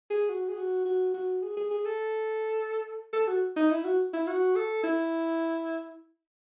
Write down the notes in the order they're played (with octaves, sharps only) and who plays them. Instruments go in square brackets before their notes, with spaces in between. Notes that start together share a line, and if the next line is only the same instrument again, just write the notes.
[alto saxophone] G#4
F#4
G#4
F#4
F#4
F#4
G#4
G#4
G#4
A4
A4
F#4
D#4
E4
F#4
E4
F#4
A4
E4